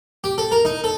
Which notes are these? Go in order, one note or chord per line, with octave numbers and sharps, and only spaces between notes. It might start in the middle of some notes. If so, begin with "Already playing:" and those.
G4
A4
A#4
D#4
A4